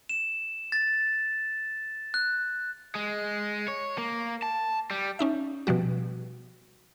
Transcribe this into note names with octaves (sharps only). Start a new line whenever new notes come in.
E7
A6
F#6
G#3
C#5
A#3
A5
G3
C#4 D#4 E5
B2 F3 G3 F#4